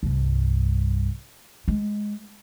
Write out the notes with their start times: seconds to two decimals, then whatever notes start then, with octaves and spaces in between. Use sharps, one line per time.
0.03 C2 G2
1.68 G#3